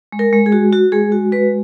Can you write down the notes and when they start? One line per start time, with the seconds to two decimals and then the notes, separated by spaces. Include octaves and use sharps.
0.12 G#3
0.19 A#4
0.33 G#3
0.46 G#4
0.52 F#4
0.73 F#4
0.92 G#3 G#4
1.12 F#4
1.32 G#3 B4